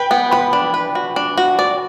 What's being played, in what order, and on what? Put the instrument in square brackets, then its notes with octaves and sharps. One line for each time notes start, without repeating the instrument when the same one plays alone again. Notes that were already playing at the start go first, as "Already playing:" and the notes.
Already playing: [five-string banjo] B4 [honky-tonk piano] G5
[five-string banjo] B3
[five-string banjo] B4 [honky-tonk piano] B5
[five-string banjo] D4
B4
F#4
D4
F#4
D5